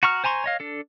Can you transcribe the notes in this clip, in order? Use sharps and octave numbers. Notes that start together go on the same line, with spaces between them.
F#4 A#5 C#6 F6
C5 G#5 A#5 C6 C#6
C#5 D#5 F5
D4 A4